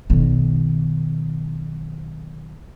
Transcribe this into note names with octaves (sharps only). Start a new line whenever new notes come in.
B1 D#3